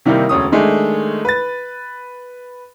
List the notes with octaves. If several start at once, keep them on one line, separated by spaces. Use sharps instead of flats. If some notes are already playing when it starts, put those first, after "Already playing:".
C3 D#3 G3 A#3 D#4 E4
E1 D2 C#4 D#6
D#3 G#3 A3 D4 G#4
B4 A6